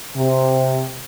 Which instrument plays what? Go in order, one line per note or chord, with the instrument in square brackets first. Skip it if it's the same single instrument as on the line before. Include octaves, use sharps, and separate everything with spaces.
[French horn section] C3